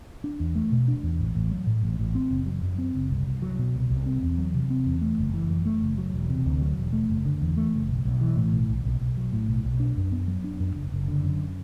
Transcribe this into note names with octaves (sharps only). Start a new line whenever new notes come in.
D4
E2
A3
B2
D4
E2
A1
A1
F#3
A2
A1
A1
C4
F#1
F#3
F#2
C4
F#1
C2
C2
F#3
B2
C2
C2
C4
E2
F#3
C3
C4
E2
A3
F#1
E3
F#2
A3
F#1
F#3
E1
C3
D2
F#3
E1
A3
F#1
D3
E2
A3
F#1
B1
B1
E3
A2
B1
B1
B1
B1
F#3
A2
B1
B1
D4
F#2
B3
F#3
D4
F#2
F#1
F#1
D3
F#2